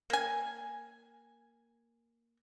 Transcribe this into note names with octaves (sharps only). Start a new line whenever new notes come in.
A#3 G#5